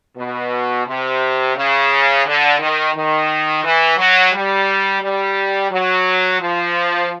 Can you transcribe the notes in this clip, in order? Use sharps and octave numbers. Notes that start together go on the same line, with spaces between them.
B2
C3
C#3
D3
D#3
D#3
E3
F#3
G3
G3
F#3
F3